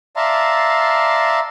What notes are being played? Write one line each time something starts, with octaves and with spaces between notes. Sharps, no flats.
D5 E5 F5 A5 A#5 C6